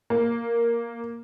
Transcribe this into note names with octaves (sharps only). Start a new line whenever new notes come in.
A#3